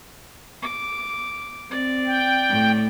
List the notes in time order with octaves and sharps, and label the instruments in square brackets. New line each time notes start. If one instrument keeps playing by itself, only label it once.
[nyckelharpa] D6
[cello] C4 [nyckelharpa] D5
[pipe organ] G5
[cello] A2